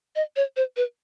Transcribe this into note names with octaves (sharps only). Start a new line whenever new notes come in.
D#5
C#5
C5
B4